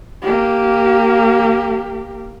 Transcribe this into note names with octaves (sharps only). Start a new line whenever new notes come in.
A#3 G4